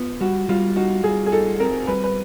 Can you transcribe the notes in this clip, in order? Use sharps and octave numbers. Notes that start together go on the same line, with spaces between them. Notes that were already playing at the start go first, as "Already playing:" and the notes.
Already playing: B3 F4
G3 F#4
G3 F4
D#4 F#4
G3 G#4
G#4
D#4 A4
C4 A#4
G3 B4
B4